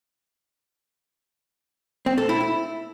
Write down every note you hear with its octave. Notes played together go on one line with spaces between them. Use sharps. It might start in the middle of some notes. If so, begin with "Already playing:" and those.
C4
A4
E4
E4